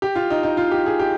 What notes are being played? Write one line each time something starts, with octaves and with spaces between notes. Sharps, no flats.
G4
F4
D#4
D#4
F4
G4
G#4
G4